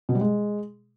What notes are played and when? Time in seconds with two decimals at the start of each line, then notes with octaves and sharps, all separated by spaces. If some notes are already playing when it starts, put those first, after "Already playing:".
0.09 B2
0.15 G3
0.21 G#3